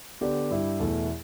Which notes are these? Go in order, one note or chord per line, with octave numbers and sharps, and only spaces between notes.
D3 B3 D4 G4 D5
G2 G3 E4 G4
E2 B2 A3 E4